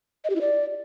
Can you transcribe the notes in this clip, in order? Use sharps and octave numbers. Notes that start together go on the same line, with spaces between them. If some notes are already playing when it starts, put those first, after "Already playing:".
D#5
G4
E4
D5